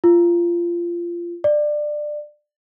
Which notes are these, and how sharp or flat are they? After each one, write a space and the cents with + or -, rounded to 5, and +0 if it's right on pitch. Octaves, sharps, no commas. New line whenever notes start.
F4 -20
D5 +20